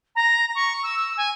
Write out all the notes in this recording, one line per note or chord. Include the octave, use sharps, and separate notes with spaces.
A#5
C#6
E6
G#5